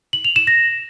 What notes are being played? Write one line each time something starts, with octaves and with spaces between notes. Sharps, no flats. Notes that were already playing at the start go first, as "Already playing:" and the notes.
F#7
F7
E7
A#6